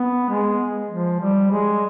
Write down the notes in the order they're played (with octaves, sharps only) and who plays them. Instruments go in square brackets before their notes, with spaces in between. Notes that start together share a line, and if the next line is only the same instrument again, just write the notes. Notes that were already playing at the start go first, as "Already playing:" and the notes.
Already playing: [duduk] B3
G#3
F3
G3
G#3